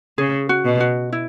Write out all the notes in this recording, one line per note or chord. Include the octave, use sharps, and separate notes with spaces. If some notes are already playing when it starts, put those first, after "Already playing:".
C#3 G#4
F#4
B2
F#4
E4